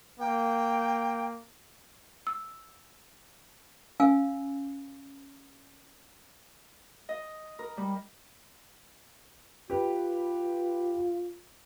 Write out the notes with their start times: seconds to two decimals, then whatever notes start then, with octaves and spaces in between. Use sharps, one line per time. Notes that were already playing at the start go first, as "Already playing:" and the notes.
0.20 A#3 G5
2.27 E6
4.00 C#4 F5 G#5 E6
7.09 D#5
7.59 A#4
7.77 G3
9.70 F4 G4 B4